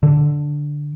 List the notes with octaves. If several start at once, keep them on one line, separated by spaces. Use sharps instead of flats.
D3